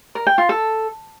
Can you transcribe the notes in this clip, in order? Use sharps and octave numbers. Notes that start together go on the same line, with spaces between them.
A#4
G5
F4
A4